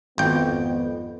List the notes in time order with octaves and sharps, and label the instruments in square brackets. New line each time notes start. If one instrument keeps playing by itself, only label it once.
[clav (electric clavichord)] G#1 G5 [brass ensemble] F2 B3